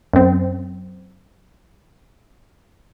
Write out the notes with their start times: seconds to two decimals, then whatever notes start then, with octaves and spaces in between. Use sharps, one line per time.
0.13 F#2 C4